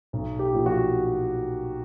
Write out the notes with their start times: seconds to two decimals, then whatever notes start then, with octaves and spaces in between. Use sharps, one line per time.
0.13 B1
0.39 G4
0.53 A#2 F3
0.66 F#4